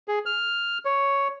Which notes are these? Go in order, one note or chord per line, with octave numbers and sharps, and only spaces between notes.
G#4
F6
C#5